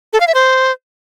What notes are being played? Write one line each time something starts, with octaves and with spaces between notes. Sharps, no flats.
A4
F5
E5
C5